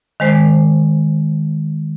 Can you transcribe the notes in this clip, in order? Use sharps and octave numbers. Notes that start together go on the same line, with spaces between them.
D#3 G#3 C5